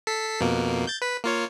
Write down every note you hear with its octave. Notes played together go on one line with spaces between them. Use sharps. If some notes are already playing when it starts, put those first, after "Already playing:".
A4 B6 C7
F2 B2 A#3
G6 A6
B4 B6
A#3 F4 C#5